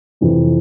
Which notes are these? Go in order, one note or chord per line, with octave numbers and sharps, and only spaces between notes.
F2 C3 E3